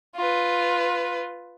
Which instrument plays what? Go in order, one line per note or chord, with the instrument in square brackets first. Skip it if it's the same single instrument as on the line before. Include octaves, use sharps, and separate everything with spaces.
[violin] F4 B4